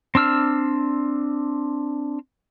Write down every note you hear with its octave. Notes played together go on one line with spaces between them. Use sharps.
C4 D4 E6 F6